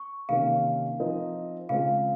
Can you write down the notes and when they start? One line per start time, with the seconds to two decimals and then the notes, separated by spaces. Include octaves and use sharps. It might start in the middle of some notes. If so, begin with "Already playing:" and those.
Already playing: C#6
0.29 C3 D#3 A#3 C#4 F5
0.99 F3 C4 D#4 A#4 D#5
1.69 C#3 G#3 C4 F4 G#4 F5